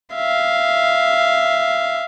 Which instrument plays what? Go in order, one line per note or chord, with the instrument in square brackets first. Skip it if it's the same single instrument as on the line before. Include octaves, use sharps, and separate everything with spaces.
[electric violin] E5 F5